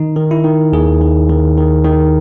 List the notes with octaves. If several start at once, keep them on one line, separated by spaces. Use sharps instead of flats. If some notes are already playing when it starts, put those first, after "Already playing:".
Already playing: D#3 D#4
D#3
E4
D#3
D#2 G#4
D#3
D#3
D#3
D#3